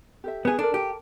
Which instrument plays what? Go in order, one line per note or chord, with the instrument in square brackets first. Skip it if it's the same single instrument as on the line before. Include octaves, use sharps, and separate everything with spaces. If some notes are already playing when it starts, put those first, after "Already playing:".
[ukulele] G4 A4 E5
[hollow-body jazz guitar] B3 G#4
[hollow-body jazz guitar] D4 [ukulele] A4 A#4
[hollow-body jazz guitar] G4